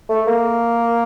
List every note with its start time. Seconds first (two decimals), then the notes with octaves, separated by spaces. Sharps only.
0.09 A3
0.27 A#3